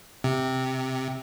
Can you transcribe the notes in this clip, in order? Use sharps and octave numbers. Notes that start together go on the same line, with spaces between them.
C3